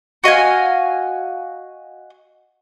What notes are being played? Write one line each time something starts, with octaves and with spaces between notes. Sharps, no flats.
F#4 D#5 F5 G#5